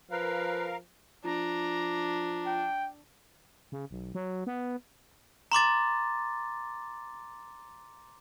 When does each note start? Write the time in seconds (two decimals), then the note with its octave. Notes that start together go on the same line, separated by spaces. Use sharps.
0.11 F3 A#4 B4 F5
1.24 F3 D4 A#5
2.46 G5
3.72 C#3
3.91 B1
4.15 F#3
4.47 B3
5.52 A#5 C6 D6 A6